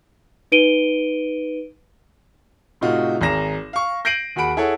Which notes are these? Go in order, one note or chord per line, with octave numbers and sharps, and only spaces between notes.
D#4 B4 D7 D#7 G7
A2 C3 D#4 F4 F#4
G#1 G#4 A#5 A#6 E7
F5 C#6
G6 A#6 C7 D7 D#7 F#7
D#2 F#4 G#4 F#5 B5 D7
E4 G#4 A4 C#5 F#5